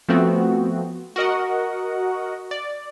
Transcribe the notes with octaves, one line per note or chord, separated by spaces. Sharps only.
F3 A3 B3 C4 F#4
F#4 A#4 D#5 F#5
D5